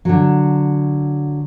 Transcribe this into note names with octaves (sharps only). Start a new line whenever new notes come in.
D3 F#3